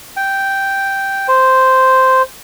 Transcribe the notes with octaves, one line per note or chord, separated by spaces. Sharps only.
G5
C5